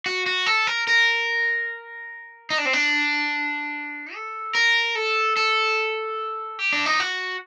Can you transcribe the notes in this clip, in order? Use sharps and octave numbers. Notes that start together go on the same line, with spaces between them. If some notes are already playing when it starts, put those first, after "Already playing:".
F#4
F#4
A4
A#4
A#4
D#4
D4
C4
D4
A4
A#4
A4
A4
G4
D4
D#4
F#4